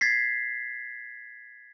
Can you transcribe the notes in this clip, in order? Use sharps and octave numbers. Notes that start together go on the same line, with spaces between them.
G#6 A6 B6 C7